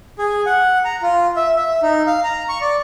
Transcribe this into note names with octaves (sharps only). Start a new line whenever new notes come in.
G#4
F#5
A#5
F4
E5
E5
D#4
F5
A#5
C#6
D5